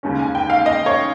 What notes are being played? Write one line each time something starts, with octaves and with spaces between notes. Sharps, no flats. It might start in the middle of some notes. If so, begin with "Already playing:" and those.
D#2 C#3 G#3 C#4
G#5
G5
F5
D#5
C#5